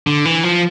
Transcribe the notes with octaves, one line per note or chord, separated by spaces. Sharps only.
D3
E3
F3